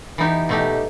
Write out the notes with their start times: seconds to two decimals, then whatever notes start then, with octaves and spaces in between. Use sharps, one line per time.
0.18 E3 B3 D#4 G4
0.49 B2 A3 D#4 G4